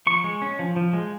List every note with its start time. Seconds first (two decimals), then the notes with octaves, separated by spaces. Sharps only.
0.07 F3 C#6
0.24 G#3
0.42 C#4
0.59 F3
0.76 F3
0.93 G#3